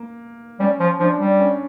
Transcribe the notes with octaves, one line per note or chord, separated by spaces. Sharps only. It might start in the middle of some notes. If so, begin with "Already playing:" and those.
Already playing: A#3
G3 C#4
F3
F3 D4
G3
C#4